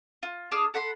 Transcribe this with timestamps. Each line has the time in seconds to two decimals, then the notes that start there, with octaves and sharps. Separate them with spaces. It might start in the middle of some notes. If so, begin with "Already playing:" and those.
0.23 F4
0.52 D4 G#4 A5 F6
0.74 A4 F#5 B5 C6